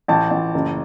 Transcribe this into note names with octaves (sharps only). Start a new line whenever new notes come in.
A1 A5
A1
F#1